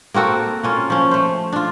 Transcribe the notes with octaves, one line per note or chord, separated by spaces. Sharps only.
A#3 C4 F#4 A4
A#3 C#4 F4
F3 C#4
A3 C5
D4 F4